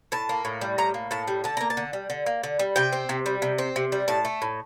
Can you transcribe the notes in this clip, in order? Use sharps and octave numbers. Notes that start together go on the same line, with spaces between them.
A2 A5
A#3
A2
G3
A2 A#5
A#3
A2 A5
G3
D3 A5
A#3 A#5
A5
D3
G3
D3
A#3
D3
G3
C3 G5
C4
C3
G3
C3
C4
C3
G3
A2 A5
A3
A2